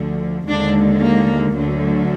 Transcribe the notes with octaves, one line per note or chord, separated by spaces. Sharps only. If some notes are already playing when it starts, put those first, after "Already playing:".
Already playing: D2 D3 F3
D#2 D3 G#3 D4
A#3
D2 D3 F#3